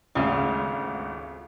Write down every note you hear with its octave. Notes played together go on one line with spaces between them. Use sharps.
G#1 D2 C#3 F4